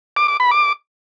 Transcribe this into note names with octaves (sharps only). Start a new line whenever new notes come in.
D6
D6
B5
D6